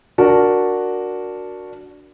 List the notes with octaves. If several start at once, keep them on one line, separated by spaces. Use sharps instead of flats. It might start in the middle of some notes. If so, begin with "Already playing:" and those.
D4 F#4 A#4 A5